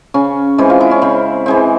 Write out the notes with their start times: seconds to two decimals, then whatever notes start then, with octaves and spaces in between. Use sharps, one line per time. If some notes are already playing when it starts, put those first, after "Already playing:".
0.14 C#3 C#4
0.58 E3 G#3 C4
0.70 F4
0.80 E4
0.91 C#4
1.02 C#3 C4
1.46 E3 G#3 C4